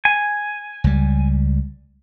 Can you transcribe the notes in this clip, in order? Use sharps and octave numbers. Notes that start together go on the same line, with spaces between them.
G#5
C#2 G3